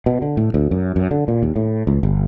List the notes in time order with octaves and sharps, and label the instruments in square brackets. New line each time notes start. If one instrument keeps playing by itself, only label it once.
[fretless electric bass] B2
D3
A2
D2
F#2
F#2
D3
A#2
D#2
A2
C#2
G1